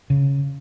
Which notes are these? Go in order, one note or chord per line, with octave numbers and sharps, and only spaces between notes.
C#3